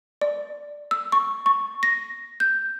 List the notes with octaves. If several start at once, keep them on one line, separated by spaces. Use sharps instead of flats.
D5
E6
C#6
C#6
A#6
G6